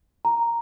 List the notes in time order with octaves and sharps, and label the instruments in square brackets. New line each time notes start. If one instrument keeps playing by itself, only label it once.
[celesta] A#5